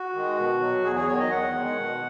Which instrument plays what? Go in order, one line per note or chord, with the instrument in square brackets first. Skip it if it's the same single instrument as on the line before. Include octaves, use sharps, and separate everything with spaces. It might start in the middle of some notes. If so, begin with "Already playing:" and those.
Already playing: [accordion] F#4
D#3 G#3
B2
F#3
E2 G#4
G#4
D#3 F#3 C#5
D#5
E2 F#5
D#3 G#3
B2